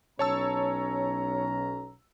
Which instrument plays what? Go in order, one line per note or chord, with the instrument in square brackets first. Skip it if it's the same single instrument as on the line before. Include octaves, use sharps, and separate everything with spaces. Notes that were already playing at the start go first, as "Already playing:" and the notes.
[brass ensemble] B1 C#4 A#5 [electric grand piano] C#5 A5 E6